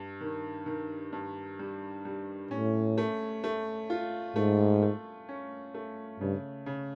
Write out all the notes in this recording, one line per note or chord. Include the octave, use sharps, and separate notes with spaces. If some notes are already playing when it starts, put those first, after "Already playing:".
Already playing: G2
D#3
D#3
G2
G3
G3
A2 C#4
A3
A3
F4
G#2 A3
A3
C#4
A3
G2 C#3
C#3